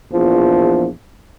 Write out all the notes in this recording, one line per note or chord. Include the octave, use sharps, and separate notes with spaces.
A#1 E2 F3